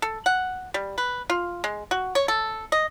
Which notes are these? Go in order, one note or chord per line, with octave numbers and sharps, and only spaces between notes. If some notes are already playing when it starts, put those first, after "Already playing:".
A4
F#5
G3
B4
F4
G#3
F#4
C#5
A4
D#5